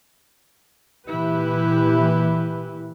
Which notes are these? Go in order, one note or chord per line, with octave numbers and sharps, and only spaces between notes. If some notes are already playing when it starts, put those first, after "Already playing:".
A#2 E3 E4 G4 B4